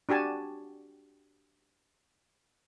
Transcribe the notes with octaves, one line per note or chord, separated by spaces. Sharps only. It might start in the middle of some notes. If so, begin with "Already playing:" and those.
D4 F#4 G4 G#5 A5